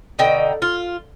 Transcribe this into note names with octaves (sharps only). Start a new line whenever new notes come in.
B2 D3 D#4 G5
F4